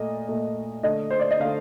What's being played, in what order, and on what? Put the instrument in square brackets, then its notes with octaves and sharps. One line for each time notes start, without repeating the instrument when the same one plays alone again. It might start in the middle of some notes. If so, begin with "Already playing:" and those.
Already playing: [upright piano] A#2 A3 D#5
A#2 A3
D3 A3 D#5
C5
D5
D#5
D3 A3 F5